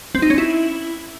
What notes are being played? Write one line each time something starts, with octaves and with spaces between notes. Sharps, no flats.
C4
D#4
C#4
E4